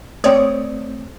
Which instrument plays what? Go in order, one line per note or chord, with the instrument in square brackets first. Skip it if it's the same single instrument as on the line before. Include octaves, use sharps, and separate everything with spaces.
[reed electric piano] A3 C4 [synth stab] C#5 D5 D#6